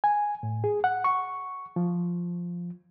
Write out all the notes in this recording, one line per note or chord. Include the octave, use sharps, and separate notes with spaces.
G#5
A2
G#4
F#5
C#6
F3